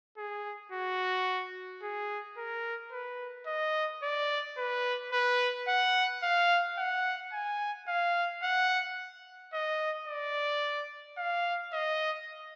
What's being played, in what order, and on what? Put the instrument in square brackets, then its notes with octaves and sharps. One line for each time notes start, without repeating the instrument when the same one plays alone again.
[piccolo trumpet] G#4
F#4
G#4
A#4
B4
D#5
D5
B4
B4
F#5
F5
F#5
G#5
F5
F#5
D#5
D5
F5
D#5